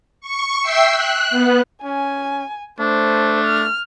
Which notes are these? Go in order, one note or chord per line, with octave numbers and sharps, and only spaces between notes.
C#6
E5 G5 E6 C7
F#6
B3
C#4 G#5
A3 D4 C5
F6